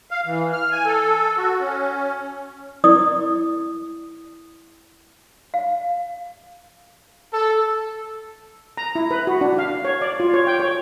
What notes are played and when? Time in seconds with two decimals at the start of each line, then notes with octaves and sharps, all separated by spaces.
0.11 F5
0.26 E3
0.53 F6
0.71 G#5
0.85 A4
1.38 F#4
1.60 C#4
2.84 E4 D5 D#6
5.54 F5
7.32 A4
8.77 A#5
8.95 E4
9.11 B4
9.27 F#4
9.41 D4
9.58 F5
9.85 C#5
10.01 D5
10.20 F4
10.34 C#5
10.47 G5
10.60 C#5